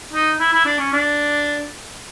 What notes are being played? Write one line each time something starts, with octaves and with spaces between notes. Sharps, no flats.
D#4
E4
E4
D4
C#4
D4